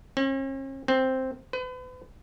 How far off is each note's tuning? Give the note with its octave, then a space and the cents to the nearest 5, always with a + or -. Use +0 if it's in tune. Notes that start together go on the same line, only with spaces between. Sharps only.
C#4 -45
C4 +0
B4 +40